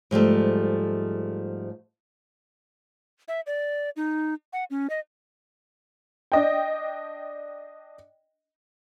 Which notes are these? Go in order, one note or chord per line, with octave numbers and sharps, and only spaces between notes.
G#2 F3 G3 A3
E5
D5
D#4
F#5
C#4
D#5
D4 D#5 G5